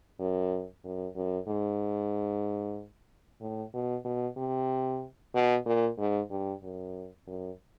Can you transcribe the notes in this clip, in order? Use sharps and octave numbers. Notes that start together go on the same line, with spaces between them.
F#2
F#2
F#2
G#2
A2
B2
B2
C3
B2
A#2
G#2
G2
F#2
F#2